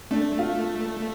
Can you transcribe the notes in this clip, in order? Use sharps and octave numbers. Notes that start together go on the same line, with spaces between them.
A3 D4
F4